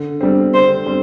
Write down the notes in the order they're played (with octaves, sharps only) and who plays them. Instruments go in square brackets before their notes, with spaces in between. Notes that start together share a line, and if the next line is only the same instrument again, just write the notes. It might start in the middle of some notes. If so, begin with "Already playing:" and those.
Already playing: [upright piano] D3
G3 C4
[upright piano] D3 [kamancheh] C5
[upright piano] G3 C4